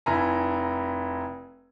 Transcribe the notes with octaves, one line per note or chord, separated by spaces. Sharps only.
F1 E4 G#5 A#5